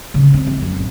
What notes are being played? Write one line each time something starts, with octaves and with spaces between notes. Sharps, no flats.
C#3
C4
E3
F#2
A1